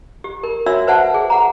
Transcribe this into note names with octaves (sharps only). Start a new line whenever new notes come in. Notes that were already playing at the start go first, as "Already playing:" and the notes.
G4
A#4
D4 F#4 C#5 E5 E6
B4 C5 E5 F#5 A5
G#4
G#4 F#5 A#5